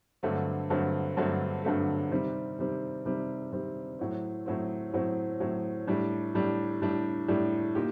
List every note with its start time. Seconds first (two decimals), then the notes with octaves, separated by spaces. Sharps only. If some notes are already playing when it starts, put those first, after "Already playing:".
0.23 G2 D3 F#3 A3 C4
0.70 G2 D3 F#3 A3 C4
1.17 G2 D3 F#3 A3 C4
1.64 G2 D3 F#3 A3 C4
2.11 C3 D#3 G3 C4
2.59 C3 D#3 G3 C4
3.06 C3 D#3 G3 C4
3.53 C3 D#3 G3 C4
3.99 A2 F#3 C4
4.46 A2 F#3 C4
4.93 A2 F#3 C4
5.40 A2 F#3 C4
5.87 A2 G3 D4
6.35 A2 G3 D4
6.82 A2 G3 D4
7.28 A2 G3 D4
7.75 A#2 D#4 G4